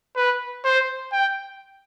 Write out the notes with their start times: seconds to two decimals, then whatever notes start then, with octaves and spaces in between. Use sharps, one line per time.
0.16 B4
0.64 C5
1.12 G5